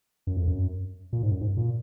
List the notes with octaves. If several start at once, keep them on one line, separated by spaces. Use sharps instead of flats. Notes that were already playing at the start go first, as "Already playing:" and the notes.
F#2
F2
F#2
A#2
G#2
F#2
G#2
A#2